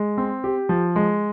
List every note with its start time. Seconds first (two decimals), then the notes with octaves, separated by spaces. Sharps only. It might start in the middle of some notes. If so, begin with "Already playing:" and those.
Already playing: G#3
0.18 C4
0.44 G4
0.69 F3
0.96 G#3